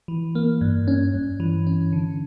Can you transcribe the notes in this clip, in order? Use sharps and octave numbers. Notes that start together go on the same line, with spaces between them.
E3
A#3
G2
C#4
G2
E3
C#4
D3